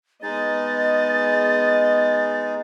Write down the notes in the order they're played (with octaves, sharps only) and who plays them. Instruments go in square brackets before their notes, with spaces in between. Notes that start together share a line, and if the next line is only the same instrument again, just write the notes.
[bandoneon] G#3 D#4 G#4 [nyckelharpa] B3 D#5 [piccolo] A6